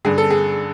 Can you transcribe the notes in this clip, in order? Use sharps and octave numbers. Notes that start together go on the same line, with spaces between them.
G2 D3 G#4
A4
G#4